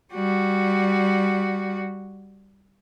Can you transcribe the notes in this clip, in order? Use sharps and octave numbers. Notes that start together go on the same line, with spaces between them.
G3 F#4